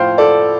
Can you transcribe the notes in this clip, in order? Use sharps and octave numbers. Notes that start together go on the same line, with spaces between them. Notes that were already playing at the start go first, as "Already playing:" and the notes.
Already playing: A2 F3 C5 F5 G5
A4 D5